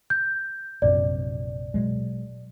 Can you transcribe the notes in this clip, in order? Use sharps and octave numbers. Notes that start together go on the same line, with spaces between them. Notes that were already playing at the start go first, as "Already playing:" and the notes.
G6
A#1 F#2 C3 D5
B2 F#3 G#3